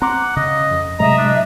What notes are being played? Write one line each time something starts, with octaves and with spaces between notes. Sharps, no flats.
C4 F#5 A#5 C6 D6
C#3 D#5
F2
A2 C3 F#3 G#3 A3 D#5 E5 A#5
D4